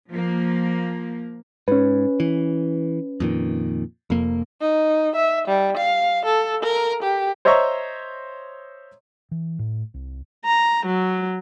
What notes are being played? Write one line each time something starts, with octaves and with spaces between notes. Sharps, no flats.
F3 A#3
G#2 C#4 B4
E3
F2 A#2 D#3
F1 F2 A#3
D#4
E5
G3
F5
A4
A#4
G4
C5 C#5 D#5 E5 A#5 C#6
E3
A2
C2
A#5
F#3